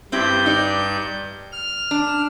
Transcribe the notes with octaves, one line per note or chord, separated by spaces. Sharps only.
G2 C4 E4 G4 G6
D#4 G4 D5
F6
D4